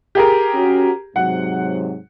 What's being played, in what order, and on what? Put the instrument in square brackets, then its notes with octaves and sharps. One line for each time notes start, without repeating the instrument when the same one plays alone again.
[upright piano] G4 G#4 A#4
[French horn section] C#4 F#4
[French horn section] G#2 C3 F#3 [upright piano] F#5